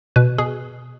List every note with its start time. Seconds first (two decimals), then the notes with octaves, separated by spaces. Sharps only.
0.16 B2 B4
0.38 B2 G#4